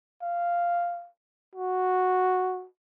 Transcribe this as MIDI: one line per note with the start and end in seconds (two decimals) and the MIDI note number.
0.22 1.09 77
1.55 2.66 66